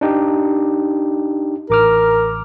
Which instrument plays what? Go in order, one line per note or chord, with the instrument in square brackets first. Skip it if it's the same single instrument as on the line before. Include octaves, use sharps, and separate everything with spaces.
[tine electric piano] D4 D#4 G4
[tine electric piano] A1 D6 F6 [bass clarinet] A#4